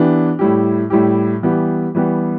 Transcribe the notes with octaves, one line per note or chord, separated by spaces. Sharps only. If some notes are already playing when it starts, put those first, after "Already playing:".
Already playing: E3 B3 D4 G4
A2 G3 E4 G4
A2 G3 E4 G4
E3 G3 B3 G4
E3 G3 B3 G4